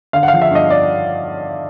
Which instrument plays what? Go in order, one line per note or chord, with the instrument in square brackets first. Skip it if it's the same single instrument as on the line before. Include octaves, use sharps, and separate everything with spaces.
[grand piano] D3 F5
F#5
F3 F5
E5
G2 D#5
D5